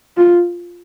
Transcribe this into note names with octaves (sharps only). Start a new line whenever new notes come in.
F4